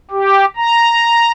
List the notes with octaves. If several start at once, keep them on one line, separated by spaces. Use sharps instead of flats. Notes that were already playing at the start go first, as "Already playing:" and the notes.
G4
A#5